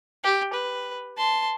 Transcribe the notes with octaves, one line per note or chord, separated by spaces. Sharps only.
G4
B4
A5 C6